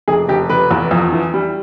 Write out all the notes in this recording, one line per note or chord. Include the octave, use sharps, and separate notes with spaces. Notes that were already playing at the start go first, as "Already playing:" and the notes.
F1 G#4
F1 G4
F1 B4
E2
F2
E3
G3